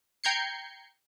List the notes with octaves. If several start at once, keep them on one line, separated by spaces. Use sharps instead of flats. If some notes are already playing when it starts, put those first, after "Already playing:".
G5 A#5 G6 G#6 C7 C#7